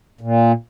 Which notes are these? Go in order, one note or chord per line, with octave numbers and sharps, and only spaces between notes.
A#2